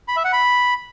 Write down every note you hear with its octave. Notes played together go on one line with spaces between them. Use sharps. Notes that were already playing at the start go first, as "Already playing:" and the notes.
B5
E5
F#5
B5